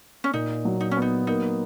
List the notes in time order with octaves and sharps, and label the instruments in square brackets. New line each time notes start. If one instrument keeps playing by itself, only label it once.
[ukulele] C#4
[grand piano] A#2 [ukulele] D#4
[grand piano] F#3
[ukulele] D#4
C#4
[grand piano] B3
[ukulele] D#4
[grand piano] A#3 [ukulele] D#4